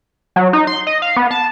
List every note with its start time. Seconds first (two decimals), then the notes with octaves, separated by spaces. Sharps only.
0.36 F#3
0.53 D#4
0.67 C6
0.87 D#5
1.02 F5
1.16 B3
1.31 A5